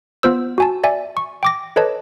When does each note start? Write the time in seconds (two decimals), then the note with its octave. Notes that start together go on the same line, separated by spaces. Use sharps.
0.23 B3 F4 C5 E6
0.58 F#4 G#5 A5
0.84 D5 E5 G#5
1.17 C#6
1.43 G5 D6 A#6
1.76 A4 B4 C#5 D#5 A5